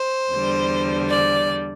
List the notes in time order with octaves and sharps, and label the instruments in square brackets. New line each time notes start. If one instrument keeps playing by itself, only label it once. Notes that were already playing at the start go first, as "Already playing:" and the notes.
Already playing: [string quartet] C5
E2 D3 G3
D5